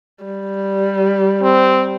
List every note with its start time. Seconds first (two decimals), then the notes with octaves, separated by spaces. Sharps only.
0.24 G3
1.42 C4